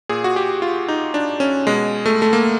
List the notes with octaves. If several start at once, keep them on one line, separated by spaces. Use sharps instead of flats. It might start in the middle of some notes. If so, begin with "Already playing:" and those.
A#2 G#4
F#4
G4
F4
D#4
D4
C#4
B2 G#3
A3
A3
A#3